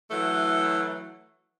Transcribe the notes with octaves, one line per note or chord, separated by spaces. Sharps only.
E3 F#3 A3